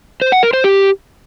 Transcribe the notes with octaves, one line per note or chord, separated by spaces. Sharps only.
C5
F#5
A#4
C5
G4